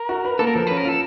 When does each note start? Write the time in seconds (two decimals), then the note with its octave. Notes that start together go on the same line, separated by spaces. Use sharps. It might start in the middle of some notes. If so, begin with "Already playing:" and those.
Already playing: A#4
0.09 F#4
0.25 B4
0.39 A#3 A4
0.47 A#4
0.54 F3 A4
0.67 C#4 B4
0.77 A#4
0.85 F4 A4